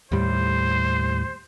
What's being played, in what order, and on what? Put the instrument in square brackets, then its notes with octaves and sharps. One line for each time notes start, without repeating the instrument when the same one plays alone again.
[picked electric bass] D#2 A2 G3 [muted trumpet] C5